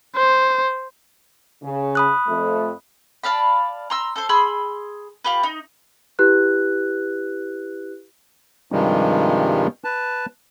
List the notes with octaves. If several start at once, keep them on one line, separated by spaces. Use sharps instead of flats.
C5
C#3
B5 D#6 F#6
F2 A3
D5 F5 A5 B5
A#5 C6 E6
A4 C5
G#4 B5 C6 E6
F4 G4 B4
D#4
E4 G4 B4 F#6
G2 C3 D#3 F3 G3 G#3
B4 A5